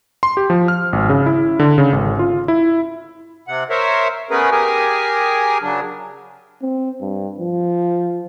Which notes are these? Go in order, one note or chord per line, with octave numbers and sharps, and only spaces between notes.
C6
G4
F3
F6
G#1
C#3
E4
D3
C#3
G#1
F4
E4
C3 F#5
A#4 C5 C#5 E5
A3 B3 C#4 G#4 A#4 B4
G4 G#4 A#4 G#5
C#3 F#3 D4
C4
G2
F3